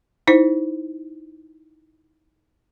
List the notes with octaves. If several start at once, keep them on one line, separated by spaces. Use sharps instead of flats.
D#4 E4 C5